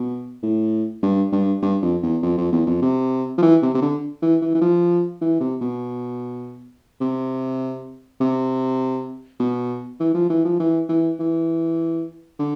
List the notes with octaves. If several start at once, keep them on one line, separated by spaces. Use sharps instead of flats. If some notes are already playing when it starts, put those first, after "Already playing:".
Already playing: B2
A2
G2
G2
G2
F2
E2
F2
F2
E2
F2
C3
F3
E3
C3
C3
D3
E3
E3
E3
F3
E3
C3
B2
C3
C3
B2
E3
F3
E3
F3
E3
E3
E3
D3